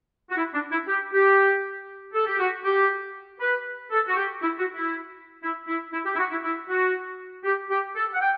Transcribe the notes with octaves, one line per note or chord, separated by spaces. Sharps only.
F#4
E4
D4
E4
G4
G4
A4
G4
F#4
G4
B4
A4
F#4
G4
E4
F#4
E4
E4
E4
E4
G4
E4
F#4
E4
E4
F#4
G4
G4
A4
F#5
G5